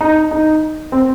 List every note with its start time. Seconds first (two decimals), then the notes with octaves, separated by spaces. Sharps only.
0.01 D#4
0.31 D#4
0.92 C4